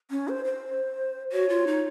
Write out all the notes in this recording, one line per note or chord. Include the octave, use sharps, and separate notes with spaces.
C#4
C5
C5
F#4 C#5
F4
D#4